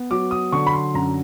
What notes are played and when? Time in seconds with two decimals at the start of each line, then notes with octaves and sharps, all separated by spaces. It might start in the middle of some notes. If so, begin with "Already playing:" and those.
Already playing: B3
0.11 F#3 D6
0.31 D#6
0.52 D3 C#6
0.67 B5
0.73 C6
0.94 F#2 A#5